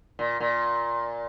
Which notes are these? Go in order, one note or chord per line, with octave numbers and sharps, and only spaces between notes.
A#2
A#2